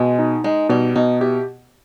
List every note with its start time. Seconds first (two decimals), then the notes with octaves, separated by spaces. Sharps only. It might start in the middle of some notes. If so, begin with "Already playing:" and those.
Already playing: B2 G#3
0.19 D#4
0.44 G#3 D#4
0.69 B2 G3
0.96 B2 D#4
1.21 E4 G4